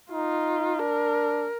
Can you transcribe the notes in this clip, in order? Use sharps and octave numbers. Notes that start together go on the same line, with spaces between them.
D#4 F4
D4 A#4